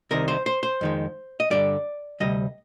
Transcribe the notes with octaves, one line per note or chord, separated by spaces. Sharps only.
C2 C3 D#3 A#4
C5
C5
C5
F2 D#3 G#3
D#5
G2 D3 G3 D5
D2 C3 G3 D#5